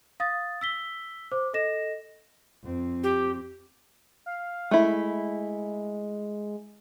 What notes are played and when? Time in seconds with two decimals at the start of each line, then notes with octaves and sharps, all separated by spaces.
0.20 F5 D#6 A6
0.61 E6 B6 G7
1.32 C5 D6
1.54 A4 D#5 A#6 E7
2.64 F2 C4
3.03 G4
4.26 F5
4.71 G#3 A3 E4